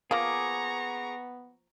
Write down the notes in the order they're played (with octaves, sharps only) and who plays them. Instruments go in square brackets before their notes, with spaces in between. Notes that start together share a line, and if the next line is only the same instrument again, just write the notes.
[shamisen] F3 A#3 [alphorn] B3 [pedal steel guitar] G#4 D6 [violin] A#5 C#6